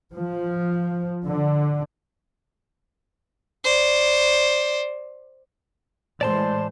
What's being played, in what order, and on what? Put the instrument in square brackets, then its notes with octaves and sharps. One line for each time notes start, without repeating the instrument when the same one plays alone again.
[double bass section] F3
D3
[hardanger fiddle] C5 D5
[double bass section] A2 E3 G#3 [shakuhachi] C5 [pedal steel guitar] D5 A5 C6